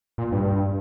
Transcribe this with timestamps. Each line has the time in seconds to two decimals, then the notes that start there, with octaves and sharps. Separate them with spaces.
0.18 A#2
0.32 G2